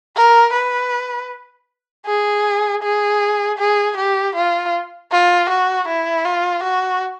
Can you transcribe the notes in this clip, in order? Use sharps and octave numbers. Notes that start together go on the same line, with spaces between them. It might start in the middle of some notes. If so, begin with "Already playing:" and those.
A#4
B4
G#4
G#4
G#4
G4
F4
F4
F#4
E4
F4
F#4